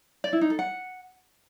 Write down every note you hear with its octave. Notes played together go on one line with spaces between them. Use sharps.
D5
E4
D#4
A4
F#5